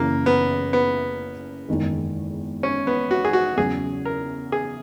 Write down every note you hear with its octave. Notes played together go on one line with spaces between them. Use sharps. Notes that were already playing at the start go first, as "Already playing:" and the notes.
Already playing: F#1 F#2 C#3 E3 A#3
B3
B3
F#1 E2 D#3 G#3
C#4
B3
F#4
G#4
F#4
E2 C#3 F#3 C#4 G#4
A#4
G#4